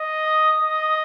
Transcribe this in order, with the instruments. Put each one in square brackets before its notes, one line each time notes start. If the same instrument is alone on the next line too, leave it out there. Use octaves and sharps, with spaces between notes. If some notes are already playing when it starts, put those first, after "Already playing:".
Already playing: [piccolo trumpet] D#5
[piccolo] D#6
[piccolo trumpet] D#5